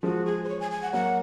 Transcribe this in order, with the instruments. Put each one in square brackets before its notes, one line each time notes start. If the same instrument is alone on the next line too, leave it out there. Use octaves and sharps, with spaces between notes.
[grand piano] F3 G#3 [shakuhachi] F#4
[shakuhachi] G#4
C5
C#5
G#5
G#5
F#5
[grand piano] F#3 A#3 [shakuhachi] F#5